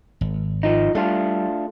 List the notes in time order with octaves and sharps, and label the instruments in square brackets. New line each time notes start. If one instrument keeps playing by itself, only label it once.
[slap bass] G#1
[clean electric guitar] F3 D#4
[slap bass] G3 [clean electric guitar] A3 D4 F4